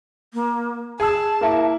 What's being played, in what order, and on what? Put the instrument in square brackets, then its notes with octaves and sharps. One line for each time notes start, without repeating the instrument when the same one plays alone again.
[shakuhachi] A#3
[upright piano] G#4 E6 [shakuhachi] A5
[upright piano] A#3 E4